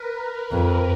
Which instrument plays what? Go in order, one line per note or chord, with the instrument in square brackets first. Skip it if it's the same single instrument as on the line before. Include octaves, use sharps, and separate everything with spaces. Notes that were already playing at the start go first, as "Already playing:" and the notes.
Already playing: [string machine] A#4 B4
B4
[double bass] F2